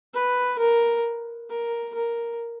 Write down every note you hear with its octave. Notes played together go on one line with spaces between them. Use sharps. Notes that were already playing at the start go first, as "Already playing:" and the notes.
B4
A#4
A#4
A#4